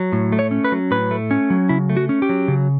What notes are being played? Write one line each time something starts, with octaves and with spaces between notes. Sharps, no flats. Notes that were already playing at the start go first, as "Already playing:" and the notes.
Already playing: F#3
A2
A3
C#5
C#4
B4
F#3
A2 B4
A3
C#4
F#3
C#3 E4
A3
F#4
C#4
G4
F#3
C#3